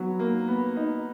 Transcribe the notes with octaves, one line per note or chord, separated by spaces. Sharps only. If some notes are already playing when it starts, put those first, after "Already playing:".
Already playing: F#3 B3
A#3
B3
D#4